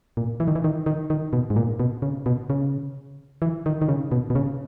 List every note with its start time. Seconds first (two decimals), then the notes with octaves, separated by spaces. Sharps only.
0.17 A#2
0.40 E3
0.48 D#3
0.55 E3
0.64 D#3
0.86 D#3
1.10 D#3
1.33 B2
1.50 G#2
1.56 A#2
1.80 B2
2.02 C#3
2.26 B2
2.50 C#3
3.42 E3
3.66 D#3
3.82 D#3
3.88 C#3
4.12 B2
4.30 B2
4.35 C#3